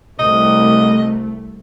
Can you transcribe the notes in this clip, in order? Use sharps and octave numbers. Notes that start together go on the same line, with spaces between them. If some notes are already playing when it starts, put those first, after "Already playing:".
C2 A3 D#5